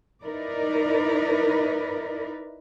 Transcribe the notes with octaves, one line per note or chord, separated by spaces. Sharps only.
D#4 E4 A#4 B4 D5